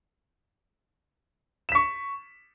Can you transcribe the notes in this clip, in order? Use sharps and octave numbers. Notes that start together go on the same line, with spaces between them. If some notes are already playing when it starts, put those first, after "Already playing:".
C#6 B6 E7